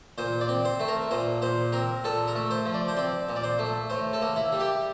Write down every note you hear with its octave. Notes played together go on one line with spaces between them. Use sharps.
A#2 C5
D5
C4
C5
A3
A#4
A#2 C5
A#2 C5
C4 A#4
A#2 A4
A#4
A3
C5
F3
D5
C5
C4 D5
A#2
D5
C5
A3
A2 C5
A4
A#3
E4
G3
G4